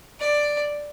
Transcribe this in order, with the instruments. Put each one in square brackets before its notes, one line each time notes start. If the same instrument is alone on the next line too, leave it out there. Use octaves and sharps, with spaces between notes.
[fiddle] D5